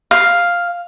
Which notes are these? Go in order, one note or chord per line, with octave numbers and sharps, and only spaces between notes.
F5